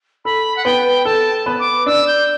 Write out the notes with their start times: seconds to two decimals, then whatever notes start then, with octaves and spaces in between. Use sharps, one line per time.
0.25 A4 B5
0.56 F#5
0.65 B3 B4 G5
1.05 A4 A5
1.46 B3 B4
1.60 D6
1.86 D4 D5 E6
2.07 G6